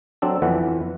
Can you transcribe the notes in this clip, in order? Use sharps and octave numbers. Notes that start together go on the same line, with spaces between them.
F#3 C4 D4 A4
F2 E3 B3 F#5